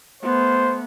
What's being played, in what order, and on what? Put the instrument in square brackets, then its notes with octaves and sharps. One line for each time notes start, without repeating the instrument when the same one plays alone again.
[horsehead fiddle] A3 B3 [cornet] C5